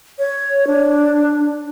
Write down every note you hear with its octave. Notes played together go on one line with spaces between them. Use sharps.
C#5
D4